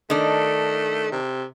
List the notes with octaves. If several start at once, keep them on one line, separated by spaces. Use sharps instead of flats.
D#3 A3 D4
C3